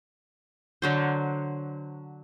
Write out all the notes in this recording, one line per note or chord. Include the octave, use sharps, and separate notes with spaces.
D3 F#3 C5